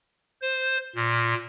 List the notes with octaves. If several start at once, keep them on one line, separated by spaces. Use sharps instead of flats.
C5
A#2